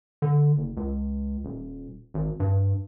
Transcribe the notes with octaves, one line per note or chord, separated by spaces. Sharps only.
D3
F#1
C#2
D#1
G#1
G2